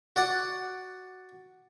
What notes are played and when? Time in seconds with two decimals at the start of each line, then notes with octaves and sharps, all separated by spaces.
0.16 F#4 D5 F#5